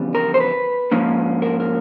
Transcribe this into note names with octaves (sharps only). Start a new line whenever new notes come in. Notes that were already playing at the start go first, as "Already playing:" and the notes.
Already playing: F2 C#3 E3 G3 B3
A#4
C5
B4
G#2 F3 A#3 C#4
A#4
A#4